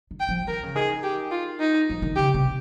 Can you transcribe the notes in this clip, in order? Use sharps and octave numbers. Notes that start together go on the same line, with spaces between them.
D#3
G5
F3
D#3 A#4
C#3
D#3 G#4
G4
F4
D#4
F3
D#3
C#3 G4
C3